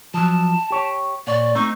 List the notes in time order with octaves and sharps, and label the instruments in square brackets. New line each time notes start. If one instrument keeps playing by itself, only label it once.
[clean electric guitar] F3 F#3 [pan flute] A5
[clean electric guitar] G4 C#5
[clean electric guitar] A#2 C#5 [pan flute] D5
[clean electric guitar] A3 C4 D#4 [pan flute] C#6